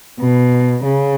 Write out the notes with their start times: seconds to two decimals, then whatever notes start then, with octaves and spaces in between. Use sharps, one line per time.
0.20 B2
0.85 C#3